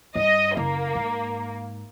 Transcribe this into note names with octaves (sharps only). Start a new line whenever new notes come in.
G2 D#5
F#1 A#3
G#2